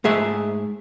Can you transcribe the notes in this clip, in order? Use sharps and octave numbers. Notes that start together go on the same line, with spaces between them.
G#2 A3 G#4 E5